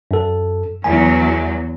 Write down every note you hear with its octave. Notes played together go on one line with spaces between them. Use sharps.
F#2 A4
E2 F#3 G#5